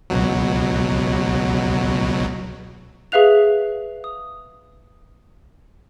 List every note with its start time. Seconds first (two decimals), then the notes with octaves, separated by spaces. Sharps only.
0.10 C#2 B2 F#3
3.12 G#4 B4 E5 F5 F#6 F7
4.04 D#6